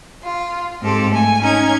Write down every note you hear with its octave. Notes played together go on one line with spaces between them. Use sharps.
F4
G#2 C4 G4 A4
A3 G#5
C#4 D#4 G#6